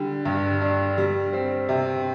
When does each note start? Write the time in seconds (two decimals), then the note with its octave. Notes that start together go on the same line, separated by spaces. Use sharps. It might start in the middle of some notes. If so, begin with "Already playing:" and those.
Already playing: D3 G3
0.25 G2
0.62 D4
0.98 G3
1.33 C4
1.69 C3